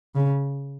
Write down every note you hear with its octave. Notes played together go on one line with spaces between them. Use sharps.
C#3